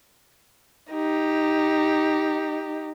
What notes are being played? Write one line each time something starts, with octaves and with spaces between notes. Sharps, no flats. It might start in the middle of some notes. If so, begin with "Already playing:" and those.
D#4 G4